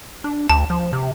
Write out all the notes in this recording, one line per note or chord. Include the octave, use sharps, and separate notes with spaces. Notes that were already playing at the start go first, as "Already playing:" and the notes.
D4
D2 A5
F3
C3